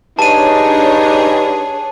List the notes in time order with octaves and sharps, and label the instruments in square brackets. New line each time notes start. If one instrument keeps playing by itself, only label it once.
[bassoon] G2 [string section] D4 G#4 C#5 [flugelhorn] D#4 [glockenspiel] A5 D#7